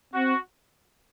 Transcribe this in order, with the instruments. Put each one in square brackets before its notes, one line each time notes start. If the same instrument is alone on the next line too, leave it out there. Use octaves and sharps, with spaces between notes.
[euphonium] C4 [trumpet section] F#4